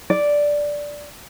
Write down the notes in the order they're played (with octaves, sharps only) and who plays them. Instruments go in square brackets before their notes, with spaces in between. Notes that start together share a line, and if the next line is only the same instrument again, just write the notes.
[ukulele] D5